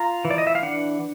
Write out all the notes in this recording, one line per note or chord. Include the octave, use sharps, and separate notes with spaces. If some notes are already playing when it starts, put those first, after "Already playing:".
Already playing: F4 A#5
E3
D5
D#5
E5
F5
D4 F#5